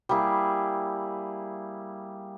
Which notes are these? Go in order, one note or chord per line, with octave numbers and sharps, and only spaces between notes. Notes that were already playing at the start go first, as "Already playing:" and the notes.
G3 A#3 E4 G#4